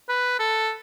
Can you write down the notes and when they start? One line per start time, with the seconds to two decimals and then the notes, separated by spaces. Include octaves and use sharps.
0.09 B4
0.40 A4